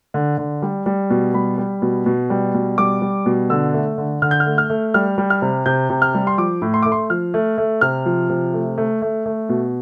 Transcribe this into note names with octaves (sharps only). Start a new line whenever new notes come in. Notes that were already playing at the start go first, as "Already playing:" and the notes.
D3
D3
G3
G3
B2
G3 B5
G3
B2
B2
G3
B2
G3 D6
G3
B2
D3 E6
A3
D3
D3 F6
G6
F6
A3
F6
A3
G3 F6
G3
F6
C3
C3 G6
C3
F6
G3
C6
F3 D6
A2
C6
A3 D6
C6
F3 F6
A3
A3
C3 F6
F3
C3
A3
A3
A3
A3
B2